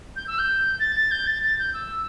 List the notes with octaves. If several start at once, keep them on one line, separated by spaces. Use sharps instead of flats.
G6
E6
G6
A6
A6
G6
A6
A6
G6
E6